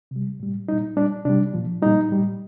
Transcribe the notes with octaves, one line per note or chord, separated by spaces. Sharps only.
C3 G3
A2 G3
A#2 G3 D#4
A#2 G3 D4
C3 G3 D4
A#2 F3
A#2 G3 D#4
A2 G3